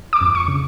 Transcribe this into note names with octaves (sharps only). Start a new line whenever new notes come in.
D6
F2
C#6
C#3